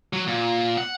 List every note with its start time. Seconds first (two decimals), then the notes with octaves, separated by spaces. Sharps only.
0.13 F#3
0.27 A#2
0.78 F#5